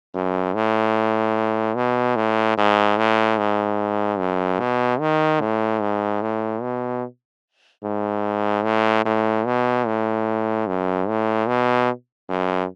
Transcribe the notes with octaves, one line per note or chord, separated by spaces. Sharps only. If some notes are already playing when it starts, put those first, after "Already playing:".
F#2
A2
B2
A2
G#2
A2
G#2
F#2
B2
D#3
A2
G#2
A2
B2
G#2
A2
A2
B2
A2
F#2
A2
B2
F#2